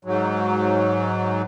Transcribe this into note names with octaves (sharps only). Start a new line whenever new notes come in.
G#2 F#3